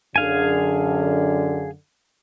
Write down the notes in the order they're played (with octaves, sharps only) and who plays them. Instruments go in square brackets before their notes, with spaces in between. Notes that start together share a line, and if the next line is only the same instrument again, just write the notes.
[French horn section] F#2 D3 [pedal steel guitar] G#4 F5 G#5